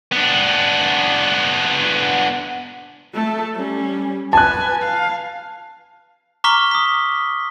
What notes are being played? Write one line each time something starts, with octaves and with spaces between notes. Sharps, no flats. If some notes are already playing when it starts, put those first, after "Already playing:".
B3 D4
A3 A4
G3 C#4
B4 G#5 A5 F#6
F5
A#5 C#6 D6 F6 B6 G7
D#6 B6